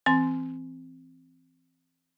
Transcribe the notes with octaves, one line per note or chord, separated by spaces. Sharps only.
E3 C4 C6